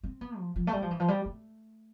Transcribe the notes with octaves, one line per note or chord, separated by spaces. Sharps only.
C4
B3
F3
F3
A3
G3
F3
E3
F3
G3
A3